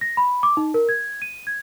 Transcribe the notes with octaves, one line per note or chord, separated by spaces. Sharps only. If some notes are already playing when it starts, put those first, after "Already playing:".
A#6
B5
D6
D#4
A#4
G#6
D#7
G#6